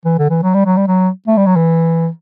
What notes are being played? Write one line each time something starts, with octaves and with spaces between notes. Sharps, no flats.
E3
D3
E3
F#3
G3
F#3
G3
F#3
A3
G3
F#3
E3